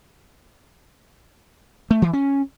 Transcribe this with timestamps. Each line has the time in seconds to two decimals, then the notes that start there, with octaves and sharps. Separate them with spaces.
1.91 A3
2.02 E3
2.13 C#4